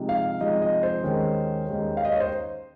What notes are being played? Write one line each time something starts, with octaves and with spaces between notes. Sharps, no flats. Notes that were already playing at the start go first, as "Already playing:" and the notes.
Already playing: C3 F3 G#3 D#4
F5
C3 F3 G#3 D#4 D#5
D#5
C5
D#2 D#3 G#3 C#4
D#2 D#3 G#3 C#4
F5
D#5
C#5
C5